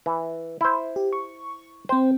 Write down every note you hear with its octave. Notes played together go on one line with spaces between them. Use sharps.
E3
E4 C5
G4
C#6
C4 C5 G5